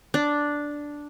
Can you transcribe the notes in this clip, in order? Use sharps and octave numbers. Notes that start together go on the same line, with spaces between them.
D4